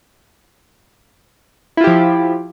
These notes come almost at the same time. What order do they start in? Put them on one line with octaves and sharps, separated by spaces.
E4 F4 G4 F3